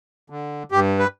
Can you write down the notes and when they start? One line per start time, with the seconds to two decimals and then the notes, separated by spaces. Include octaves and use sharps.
0.30 D3
0.72 G2 G4
0.99 B4